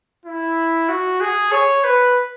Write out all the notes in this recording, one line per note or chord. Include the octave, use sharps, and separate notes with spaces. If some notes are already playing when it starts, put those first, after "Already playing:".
E4
F#4
G#4
C#5
B4